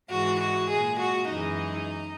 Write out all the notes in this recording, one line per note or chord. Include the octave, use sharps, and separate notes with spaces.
G#2 E3 G#3 F#4
F#4
A#2 G#3 G#4
F#4
F#2 E3 G#3 D#4